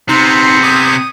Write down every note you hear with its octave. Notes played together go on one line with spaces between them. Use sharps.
C3 B3 C4 D#4 C6 C#7
D6 D#6 G6 G#6